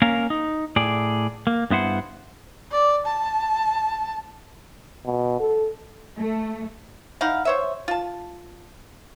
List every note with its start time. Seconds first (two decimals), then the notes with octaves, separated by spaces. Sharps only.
0.02 A#3 C#4 A#4 F5
0.30 D#4
0.76 A2 G#4 D5
1.47 A#3
1.70 G2 B3 E4 C5 F#5
2.71 D5
3.06 A5
5.06 B2
5.40 A4
6.16 A3
7.21 D#4 E4 F5 F#5
7.45 C5 C#5 E5
7.88 F4 A5